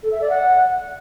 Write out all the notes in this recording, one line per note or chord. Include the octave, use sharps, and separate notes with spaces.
A4
E5
D5
F#5